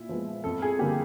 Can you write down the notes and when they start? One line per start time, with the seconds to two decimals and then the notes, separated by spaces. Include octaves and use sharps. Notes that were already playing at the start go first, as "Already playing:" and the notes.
Already playing: A#2 E4
0.09 F3 G#3 B3
0.44 F2 A4
0.62 G#4
0.79 D3 G3 A#3 G4